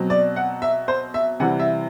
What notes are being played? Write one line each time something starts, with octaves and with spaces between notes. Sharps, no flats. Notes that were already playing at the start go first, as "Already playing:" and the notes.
Already playing: B2 F#3 C4
D5
F#5
E5
C5
E5
C3 E3 G3 F#5
E5